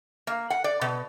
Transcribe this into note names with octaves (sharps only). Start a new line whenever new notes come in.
A#3
F#5
D5
B2